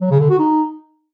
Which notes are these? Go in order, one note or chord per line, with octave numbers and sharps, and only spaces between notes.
F#3
C#3
D3
F#4
D#4